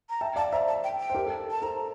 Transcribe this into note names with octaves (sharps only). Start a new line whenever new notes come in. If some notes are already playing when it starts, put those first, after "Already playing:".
A#5
E5 G5 A5
D5 F5 A5
C5 E5 A#5
A5
G5
G5
C5
G4 A#4
A4
A5
A4 C5 A#5